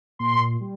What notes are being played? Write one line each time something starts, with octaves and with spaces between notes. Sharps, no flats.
A#2 C6
G3